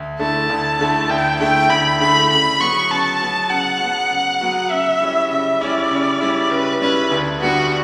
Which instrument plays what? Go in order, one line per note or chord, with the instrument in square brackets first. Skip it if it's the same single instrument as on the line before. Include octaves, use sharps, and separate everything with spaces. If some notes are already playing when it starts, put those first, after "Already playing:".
Already playing: [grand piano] D2
[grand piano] D3 A3 E4 [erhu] A5
[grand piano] D2
D3 A3 E4
[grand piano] D2 [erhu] G5
[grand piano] D3 A3 E4 [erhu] G5
[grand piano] D2 [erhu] B5
[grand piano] D3 A3 E4 [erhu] B5
[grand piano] C#3 [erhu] B5
[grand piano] F#3 B3 F#4 [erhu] C#6
[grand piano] C#3 [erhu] A5
[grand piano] F#3 B3 F#4
[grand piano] C#3 [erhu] F#5
[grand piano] F#3 B3 F#4
C#3
F#3 B3 F#4
[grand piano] C#3 [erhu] E5
[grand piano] G3 C#4 E4
[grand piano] C#3 [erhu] E5
[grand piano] G3 C#4 E4 [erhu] D5
[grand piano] C#3
G3 C#4 E4
[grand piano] C#3 [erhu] B4
[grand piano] G3 C#4 E4 [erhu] B4
[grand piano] D2
[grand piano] D3 G3 B3 [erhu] F#4